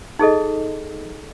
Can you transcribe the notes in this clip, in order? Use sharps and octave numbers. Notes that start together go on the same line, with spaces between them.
D#4 G#4 A4 D#5